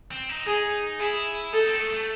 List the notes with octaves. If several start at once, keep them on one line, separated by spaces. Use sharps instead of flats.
C4
D#4
D#4 G#4
E4 G#4
D#4 A4
C4
A3
A3